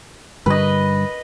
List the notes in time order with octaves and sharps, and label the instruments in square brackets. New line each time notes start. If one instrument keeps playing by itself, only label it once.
[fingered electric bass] G2 D3 G3 [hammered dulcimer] B4 D#5